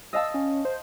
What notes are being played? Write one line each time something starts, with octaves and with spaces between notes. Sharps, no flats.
D#5 F5 A5 E6
C#4
C5